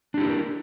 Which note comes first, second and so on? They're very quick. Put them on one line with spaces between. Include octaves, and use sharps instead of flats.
D4 G4 E4 A#4